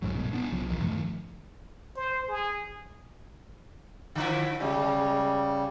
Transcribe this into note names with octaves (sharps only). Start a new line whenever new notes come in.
C2 G#2 F#3
G2 B2
B3 D4
C2 F3 F#3
A#1 D#2
G2 D#3 F3 A3
C5
G#4
D3 F3 E4
C#3 G3 G#3